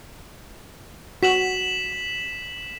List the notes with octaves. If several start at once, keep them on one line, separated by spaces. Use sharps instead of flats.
F#4 B6 E7 F#7